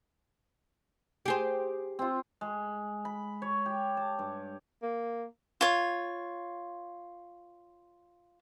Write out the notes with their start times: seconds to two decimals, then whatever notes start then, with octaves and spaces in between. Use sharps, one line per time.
1.26 G4 G#4 C5
1.99 C4 F4
2.41 G#3
3.05 B5
3.42 C#5
3.66 G4
3.97 A5
4.19 G2
4.83 A#3
5.61 F4 C#5